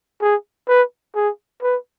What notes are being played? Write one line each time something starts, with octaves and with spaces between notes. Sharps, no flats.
G#4
B4
G#4
B4